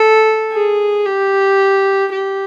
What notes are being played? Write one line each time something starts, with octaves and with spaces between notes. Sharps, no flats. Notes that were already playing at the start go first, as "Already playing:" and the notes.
Already playing: A4
G#4
G4
G4